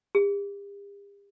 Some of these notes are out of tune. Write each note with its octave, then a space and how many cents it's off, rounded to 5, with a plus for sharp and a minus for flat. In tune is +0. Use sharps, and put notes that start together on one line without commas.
G4 +45